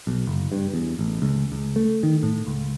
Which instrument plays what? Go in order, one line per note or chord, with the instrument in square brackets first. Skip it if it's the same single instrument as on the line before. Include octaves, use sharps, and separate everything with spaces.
[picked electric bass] B1
F#1
G2
E2
A1
C#2
C#2
A3
D#3
A2
C#2